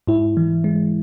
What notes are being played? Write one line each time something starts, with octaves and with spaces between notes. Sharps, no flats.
G#2 E4
E3
G#3